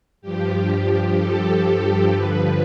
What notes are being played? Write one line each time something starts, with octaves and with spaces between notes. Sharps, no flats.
G2 F3 G4
A4
G2 D3 F3 B4